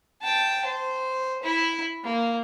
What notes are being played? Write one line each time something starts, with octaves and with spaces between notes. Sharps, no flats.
G5 A5
C5
E4 B5
A#3